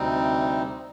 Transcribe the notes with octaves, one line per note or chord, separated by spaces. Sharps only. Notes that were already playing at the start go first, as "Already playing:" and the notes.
Already playing: D2 C3 G3 C4 D#4